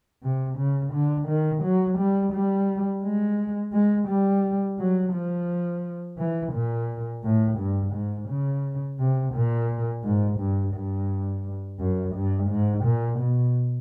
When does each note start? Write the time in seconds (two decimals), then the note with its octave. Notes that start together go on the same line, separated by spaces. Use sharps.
0.22 C3
0.58 C#3
0.93 D3
1.28 D#3
1.63 F#3
1.98 G3
2.33 G3
3.03 G#3
3.73 G#3
4.08 G3
4.79 F#3
5.13 F3
6.18 E3
6.53 A#2
7.24 A2
7.58 G2
7.93 G#2
8.29 C#3
8.99 C3
9.33 A#2
10.04 G#2
10.39 G2
10.74 G2
11.80 F#2
12.15 G2
12.50 G#2
12.84 A#2
13.19 B2